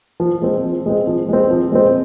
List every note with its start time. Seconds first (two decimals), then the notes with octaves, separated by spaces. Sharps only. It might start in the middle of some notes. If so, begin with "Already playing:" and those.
0.20 F3
0.42 G#3 C4
0.64 F3
0.86 G#3 C4
1.07 F3
1.29 G#3 C4
1.50 F3
1.72 G#3 C4